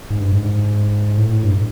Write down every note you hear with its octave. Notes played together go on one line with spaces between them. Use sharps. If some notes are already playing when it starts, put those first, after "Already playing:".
G#2
G2
G#2
A2
G2